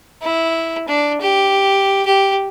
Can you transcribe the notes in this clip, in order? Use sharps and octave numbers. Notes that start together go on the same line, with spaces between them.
E4
D4
G4
G4